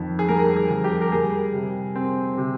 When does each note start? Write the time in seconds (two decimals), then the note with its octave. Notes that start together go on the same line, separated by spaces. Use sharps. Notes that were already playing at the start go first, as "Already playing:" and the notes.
Already playing: F2 D#3
0.19 G#4
0.28 G3 A#4
0.57 G#4
0.71 F2
0.84 G4
1.01 A#4
1.12 G3 G#4
1.53 C3
1.95 C4
2.37 C3